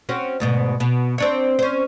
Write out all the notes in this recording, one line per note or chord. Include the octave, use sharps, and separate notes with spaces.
C4 C#4 F#4
D2 G#2 B2
B2
C4 D4 C#5
C#4 C5